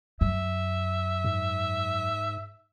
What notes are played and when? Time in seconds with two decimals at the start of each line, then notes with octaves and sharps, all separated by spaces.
0.21 F#2 E5
1.24 G#2